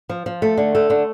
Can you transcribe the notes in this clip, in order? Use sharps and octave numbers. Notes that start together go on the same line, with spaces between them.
F3
F3
A3
D3
A3
D3